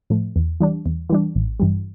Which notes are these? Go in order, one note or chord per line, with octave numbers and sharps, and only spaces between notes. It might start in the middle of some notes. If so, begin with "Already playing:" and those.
A2 F3 A3
E2
E3 G3 D4
E2
E3 G3 D4
A1
G2 E3 G3